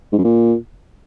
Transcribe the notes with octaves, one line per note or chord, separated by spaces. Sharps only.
G#2
F#2
A#2